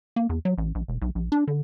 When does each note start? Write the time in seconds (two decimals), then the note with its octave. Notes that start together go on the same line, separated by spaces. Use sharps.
0.16 A#3
0.29 E2
0.45 F#3
0.58 A1
0.75 A#1
0.88 E1
1.02 B1
1.15 A#1
1.32 D4
1.47 D3